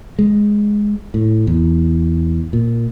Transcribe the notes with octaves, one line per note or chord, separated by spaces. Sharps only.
G#3
A2
E2
A#2